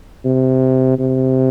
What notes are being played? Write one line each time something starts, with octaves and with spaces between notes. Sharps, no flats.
C3
C3